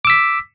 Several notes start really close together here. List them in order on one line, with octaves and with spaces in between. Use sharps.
D6 E6 B6